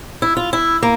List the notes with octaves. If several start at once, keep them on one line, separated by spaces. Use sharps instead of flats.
E4
F4
E4
A#3